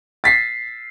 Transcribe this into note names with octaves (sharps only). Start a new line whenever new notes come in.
A6 B6 C7